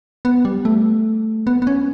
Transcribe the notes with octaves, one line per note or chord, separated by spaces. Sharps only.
B3
G3
A3
B3
B3
C#4